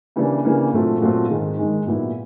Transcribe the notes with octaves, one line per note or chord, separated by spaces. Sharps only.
C#3 E3 G3 A#3 D4
C#3 E3 G3 A#3 D4
A#2 F#3 A3 C4 F4
A#2 F#3 A3 C4 F4
G#2 D#3 G#3
G#2 D#3 G#3
A#2 F#3 B3 E4